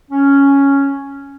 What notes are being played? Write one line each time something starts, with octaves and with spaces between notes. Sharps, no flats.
C#4